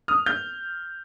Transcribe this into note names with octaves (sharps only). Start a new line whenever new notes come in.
D#6 F6
F6 G6